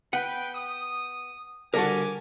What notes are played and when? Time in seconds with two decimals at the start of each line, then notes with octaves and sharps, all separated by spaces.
0.13 B3 B4 F#5 G5
0.54 D#6
1.74 D3 G3 F#4 A4 A#4 G#5 D6